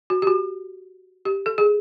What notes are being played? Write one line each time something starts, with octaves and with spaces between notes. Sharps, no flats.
F#4
G4
F#4
G4
A4
G#4